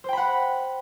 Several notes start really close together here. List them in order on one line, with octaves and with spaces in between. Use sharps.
C5 G5 B5 F#5